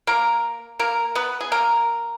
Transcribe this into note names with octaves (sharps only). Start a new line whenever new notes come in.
A#3 A#4
A#3 A#4
B3 B4
G#4
A#3 A#4